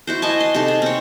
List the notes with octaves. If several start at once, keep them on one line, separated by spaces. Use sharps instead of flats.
E4 F#4 C5
D#5 G#5 A5
C6
C3 D#4 A4 A5
G#4
C4 C#5